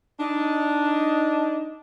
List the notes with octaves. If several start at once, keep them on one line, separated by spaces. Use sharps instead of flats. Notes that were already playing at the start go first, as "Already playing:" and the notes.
D4 D#4